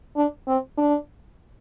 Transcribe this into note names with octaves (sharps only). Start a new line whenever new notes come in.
D4
C4
D4